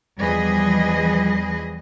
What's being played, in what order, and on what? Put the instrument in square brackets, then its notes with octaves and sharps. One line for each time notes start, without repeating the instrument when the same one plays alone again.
[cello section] E2 F3 G3 G#4 B4 D#5